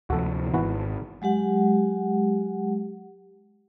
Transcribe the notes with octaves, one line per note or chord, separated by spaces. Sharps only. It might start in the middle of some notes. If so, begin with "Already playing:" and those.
D2 C3 F3 F#4 A4
G#1 E3 B3 F#4
F#3 G#3 G4 F#5